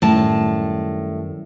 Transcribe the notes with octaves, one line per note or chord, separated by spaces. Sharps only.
F#2 A2 D#3 G3 A5